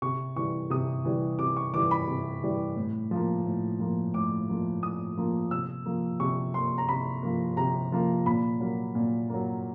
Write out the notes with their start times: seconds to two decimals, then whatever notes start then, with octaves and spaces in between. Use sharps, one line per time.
0.02 C3 C#6
0.36 E3 G3 C#6
0.70 C3 D#6
1.05 E3 G3
1.39 C3 D6
1.57 C#6
1.74 E3 G3 D6
1.91 B5
2.08 C3
2.43 E3 G3
2.76 A2
3.11 F3 A#3
3.45 A2
3.80 F3 A#3
4.14 A2 D6
4.48 F3 A#3
4.83 A2 D#6
5.17 F3 A#3
5.51 C3 E6
5.86 F3 A#3
6.20 C3 C#6
6.54 F3 A#3 C6
6.78 A#5
6.89 C3 B5
7.23 F3 A#3
7.57 C3 A#5
7.92 F3 A#3
8.26 A#2 B5
8.60 F#3 A#3
8.95 A#2
9.30 F#3 A#3